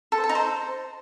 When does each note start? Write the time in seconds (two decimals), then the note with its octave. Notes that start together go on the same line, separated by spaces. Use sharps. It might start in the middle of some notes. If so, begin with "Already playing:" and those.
0.12 A4
0.18 C5
0.24 A4
0.29 D#4
0.35 C5